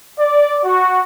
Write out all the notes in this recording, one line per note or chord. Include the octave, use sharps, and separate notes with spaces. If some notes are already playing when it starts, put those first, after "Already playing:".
D5
F#4